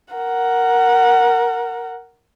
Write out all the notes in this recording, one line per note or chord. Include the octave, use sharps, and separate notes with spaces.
A#4 F#5